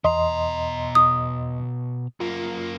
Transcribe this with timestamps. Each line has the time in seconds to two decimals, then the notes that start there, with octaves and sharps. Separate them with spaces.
0.04 E2 B2 D#5 A#5 C6
0.95 D#6
2.20 F#2 A#3 F4